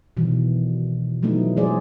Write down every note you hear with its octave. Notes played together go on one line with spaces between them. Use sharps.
B2 D#3 E3 G3
F3 F#3 A3 B3 D#4 E4
F3 G#3 G#4 C5 D5